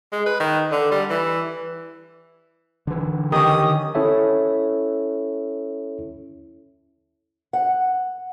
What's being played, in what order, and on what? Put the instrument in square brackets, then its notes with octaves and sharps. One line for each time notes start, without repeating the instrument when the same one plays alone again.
[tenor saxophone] G#3
B4
D#3
D3
G3
E3
[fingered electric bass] D3 E3
[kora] D#3 C#4 [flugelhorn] G4 [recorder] D#6
[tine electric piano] C#4 E4 A4 C#5 E5
[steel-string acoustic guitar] F#5